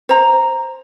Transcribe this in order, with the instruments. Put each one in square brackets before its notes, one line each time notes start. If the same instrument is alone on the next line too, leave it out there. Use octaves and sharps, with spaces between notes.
[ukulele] C5 A#5